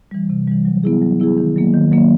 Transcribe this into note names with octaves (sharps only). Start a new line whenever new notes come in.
E3 G3
C3
E3 G3
F#3
B3 E4 G#4
F#3
B3 E4 G#4
D#3
F#3 A#3
D#3
F#3 A#3